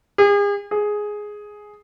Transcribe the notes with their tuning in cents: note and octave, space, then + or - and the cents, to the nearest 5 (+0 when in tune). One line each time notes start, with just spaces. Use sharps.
G#4 -40
G#4 +5